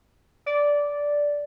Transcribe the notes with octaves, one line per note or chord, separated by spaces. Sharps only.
D5